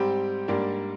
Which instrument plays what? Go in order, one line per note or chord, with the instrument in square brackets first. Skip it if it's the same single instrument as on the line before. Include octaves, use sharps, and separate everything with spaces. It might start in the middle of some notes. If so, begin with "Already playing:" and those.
Already playing: [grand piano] G#2 G3 C4 G4
G#2 G3 A#3 D4